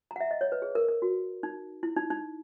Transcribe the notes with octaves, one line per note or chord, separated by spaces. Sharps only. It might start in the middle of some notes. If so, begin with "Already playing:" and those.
A#5
F#5
E5
D#5
C#5
B4
G#4
A#4
A#4
F#4
D#4
E4
D#4
D#4